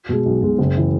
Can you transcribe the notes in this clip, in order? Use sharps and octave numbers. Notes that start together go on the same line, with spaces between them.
B2 G#3
B1
B2 G#3
F#1
E3